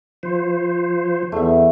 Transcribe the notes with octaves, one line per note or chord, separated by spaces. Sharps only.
F3 C5
E2 A3 E5